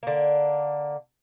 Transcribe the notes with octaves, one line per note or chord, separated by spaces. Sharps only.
D3 A#3